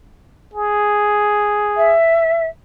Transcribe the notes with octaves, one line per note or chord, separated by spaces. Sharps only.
G#4
E5